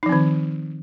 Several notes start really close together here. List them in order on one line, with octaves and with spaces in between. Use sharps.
D#4 F3 C4 D#3